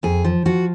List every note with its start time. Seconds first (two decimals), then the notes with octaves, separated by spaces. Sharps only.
0.03 F2 G#4
0.24 F3
0.45 F3 F#4